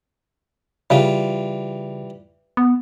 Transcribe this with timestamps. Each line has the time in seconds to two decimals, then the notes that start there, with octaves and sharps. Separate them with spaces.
0.90 C#3 E3 G3 F4
2.57 B3